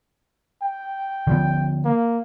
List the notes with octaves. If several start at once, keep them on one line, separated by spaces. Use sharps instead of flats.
G5
D3 F3 B3
A#3